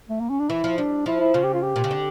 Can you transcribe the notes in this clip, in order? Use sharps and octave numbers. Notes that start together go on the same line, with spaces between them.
A3
A#3
C#4
D4
E3 E4
F3
G3 D4
F3 E4
E4
C#3 F4
G4
F4
G4
A#2
C#3
D3